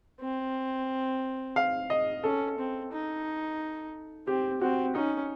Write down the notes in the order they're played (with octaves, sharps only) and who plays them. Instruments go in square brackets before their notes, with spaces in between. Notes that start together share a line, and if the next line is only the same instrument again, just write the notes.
[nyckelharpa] C4
[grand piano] F5
D#5
[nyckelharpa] C#4 [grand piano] A4
[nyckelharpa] C4
D#4
[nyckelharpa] C4 [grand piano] G4
[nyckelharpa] C4 [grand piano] F#4
[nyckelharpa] C#4 [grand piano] D#4